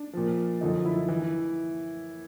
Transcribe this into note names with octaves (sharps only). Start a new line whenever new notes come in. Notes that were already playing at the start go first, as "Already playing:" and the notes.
Already playing: D4
A#2 F3
F#2 D3 F3 D#4
E4
E3